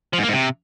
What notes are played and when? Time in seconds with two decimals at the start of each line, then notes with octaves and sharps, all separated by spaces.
0.13 F3
0.18 G#2
0.23 A#3
0.28 G#2
0.33 C3